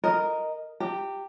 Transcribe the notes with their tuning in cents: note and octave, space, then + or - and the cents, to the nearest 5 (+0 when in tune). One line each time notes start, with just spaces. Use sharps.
A#4 +0 D#5 +0
G4 +0 A#5 -35